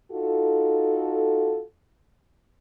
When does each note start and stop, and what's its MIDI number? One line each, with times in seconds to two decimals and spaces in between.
0.12 1.62 63
0.12 1.62 65
0.12 1.62 66
0.12 1.62 69